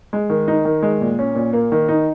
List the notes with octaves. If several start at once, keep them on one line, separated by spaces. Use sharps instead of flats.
G#3
D#3
D#4
D#3
G#3
A#2
C#4
A#2
A#3
D#3
D#4